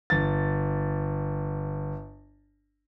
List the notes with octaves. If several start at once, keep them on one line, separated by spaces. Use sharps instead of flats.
G1 A6